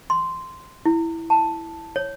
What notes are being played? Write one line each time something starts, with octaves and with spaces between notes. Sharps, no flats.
C6
E4
A5
C#5